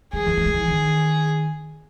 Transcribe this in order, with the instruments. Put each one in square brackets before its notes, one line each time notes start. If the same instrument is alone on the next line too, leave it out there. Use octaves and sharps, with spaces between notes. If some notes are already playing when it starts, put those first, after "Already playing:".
[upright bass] G3 [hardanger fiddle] G#4
[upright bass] E3
G#3
G3
E3
D#3